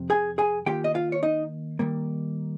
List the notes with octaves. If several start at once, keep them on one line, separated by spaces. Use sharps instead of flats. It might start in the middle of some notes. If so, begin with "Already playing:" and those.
Already playing: F2 C3
G#4 G#5
G#4 G#5
D#3 A#3 F4 G4 G5
D#5
F4 F5
C#5
D#4 D#5
D#3 G3 A#3